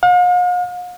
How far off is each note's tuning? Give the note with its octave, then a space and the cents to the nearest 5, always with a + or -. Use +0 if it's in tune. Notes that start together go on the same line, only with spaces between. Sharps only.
F5 +45